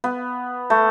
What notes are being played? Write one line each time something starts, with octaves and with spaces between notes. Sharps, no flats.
B3
A3